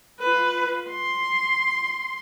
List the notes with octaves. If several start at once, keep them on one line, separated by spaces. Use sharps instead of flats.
F4 B4
C6